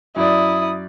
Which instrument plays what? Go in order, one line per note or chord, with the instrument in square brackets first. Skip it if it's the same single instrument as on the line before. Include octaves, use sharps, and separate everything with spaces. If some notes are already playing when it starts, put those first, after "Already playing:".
[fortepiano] F#2 D5 [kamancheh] E4 D#6